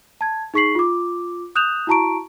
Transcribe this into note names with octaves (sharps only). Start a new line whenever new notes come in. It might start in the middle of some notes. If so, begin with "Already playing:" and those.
A5 G#6
D#4 G#4 C#6 B6 C7 F#7
F4 D6
D#6 F#6 G6 E7 F7
E4 F#4 A5 A#5 C#6 D7